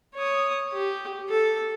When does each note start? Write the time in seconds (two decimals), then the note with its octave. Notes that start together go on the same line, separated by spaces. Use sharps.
0.15 C#5 D#6
0.72 G4
1.29 A4